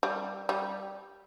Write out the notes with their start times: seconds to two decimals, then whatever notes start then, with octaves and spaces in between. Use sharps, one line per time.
0.03 G3
0.49 G3